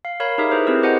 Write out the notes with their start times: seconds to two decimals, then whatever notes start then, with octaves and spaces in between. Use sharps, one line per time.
0.05 F5
0.20 A#4 C#5 F5 B5
0.38 D#4 G4 G#4 A#4 E5
0.51 E4 G#4 B4 C5
0.67 C4 E4 G4 G#4 A#4
0.83 F#4 C5 D#5 F#5 G#5